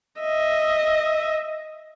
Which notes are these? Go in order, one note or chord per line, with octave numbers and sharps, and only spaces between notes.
D#5 E5